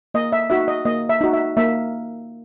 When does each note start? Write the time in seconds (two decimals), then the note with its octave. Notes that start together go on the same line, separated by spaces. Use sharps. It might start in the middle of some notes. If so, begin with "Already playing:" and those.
0.14 A#3 D#5
0.32 E5
0.50 D#4 F#4 E5
0.68 D#5
0.85 A#3 D#5
1.09 E5
1.21 D#4 F#4
1.33 E5
1.57 A#3 E5